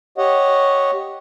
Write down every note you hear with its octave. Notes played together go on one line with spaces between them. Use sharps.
G4 C#5 D#5 F#5